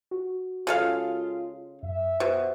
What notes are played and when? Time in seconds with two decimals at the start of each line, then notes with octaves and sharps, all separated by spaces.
0.11 F#4
0.67 C#3 G#3 F4 A4 F5
1.83 F#2 E5
2.20 B2 G4 C5